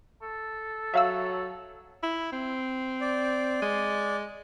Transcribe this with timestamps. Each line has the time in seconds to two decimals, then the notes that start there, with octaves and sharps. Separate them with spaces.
0.22 A4
0.94 F#3 E5 F5 E6
2.03 E4
2.33 C4
3.01 D5
3.62 G#3